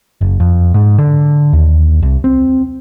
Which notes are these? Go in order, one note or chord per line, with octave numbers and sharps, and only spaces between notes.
F#1
F2
G#2
D3
D#2
C2
C4